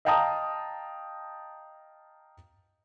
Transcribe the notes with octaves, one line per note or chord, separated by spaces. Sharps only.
D#5 F5 G5 A5 A#5 D#6